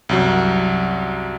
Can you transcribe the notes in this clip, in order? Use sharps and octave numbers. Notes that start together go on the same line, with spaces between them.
C2 F#2 F#3